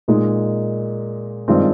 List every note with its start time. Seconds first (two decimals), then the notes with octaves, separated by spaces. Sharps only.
0.08 A#2 G#3 D#4
1.48 G2 D#3 G#3 C4 F4